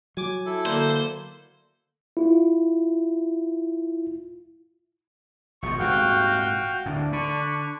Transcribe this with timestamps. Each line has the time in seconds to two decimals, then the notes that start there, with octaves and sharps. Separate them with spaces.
0.17 F#3 G#5 D6
0.46 E4 A4
0.66 D3 A#3 C5
2.17 E4 F4
5.62 G#1 B2 F3 C#6
5.79 D#1 G#2 C3 F#4 F5 G5 F#6
6.86 D2 A2 D4
7.13 D3 B5 C#6